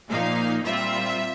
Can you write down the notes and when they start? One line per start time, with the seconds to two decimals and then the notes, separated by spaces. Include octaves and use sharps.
0.10 A#2 F3 A#3 D#4 F5
0.65 A#2 G3 C4 F4 E5